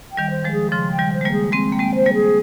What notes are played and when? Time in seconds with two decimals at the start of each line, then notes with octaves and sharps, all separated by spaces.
0.11 G5
0.17 D#3 G3
0.31 C5
0.45 F3 G#3
0.52 G#4
0.72 C#3 F3 C6
0.93 G5
0.98 D#3 G3
1.13 C5
1.21 G#3
1.25 G3 A#3
1.33 G#4
1.52 G#3 C4 C6
1.72 A#3 G5
1.79 G#3 C4
1.94 C5
2.06 G3 A#3
2.14 G#4